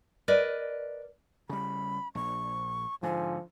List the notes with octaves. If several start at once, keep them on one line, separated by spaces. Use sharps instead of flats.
A#4 B4 D5 D#5
C#3 G3 B5
A#1 C#6
G#2 D3 F3 G#5